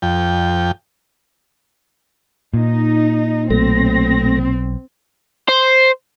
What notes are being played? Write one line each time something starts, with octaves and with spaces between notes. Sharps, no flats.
F2 G5
A#2 D#4
B1 B2 A3 C4 A#6
C5